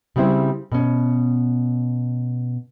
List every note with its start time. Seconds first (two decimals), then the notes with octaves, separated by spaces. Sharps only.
0.16 C#3 G3 C4 E4 C5
0.72 B2 C#4